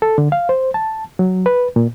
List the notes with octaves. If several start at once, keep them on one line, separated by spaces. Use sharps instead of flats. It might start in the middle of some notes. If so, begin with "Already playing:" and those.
A4
D3
F5
C5
A5
F#3
B4
A#2